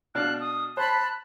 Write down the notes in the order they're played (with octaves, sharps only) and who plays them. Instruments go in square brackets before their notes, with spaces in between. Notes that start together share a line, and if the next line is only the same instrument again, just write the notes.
[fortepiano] B2 D4 F5 [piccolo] F#6
[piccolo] D#6
[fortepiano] C5 [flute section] A5 B5 [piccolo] F#6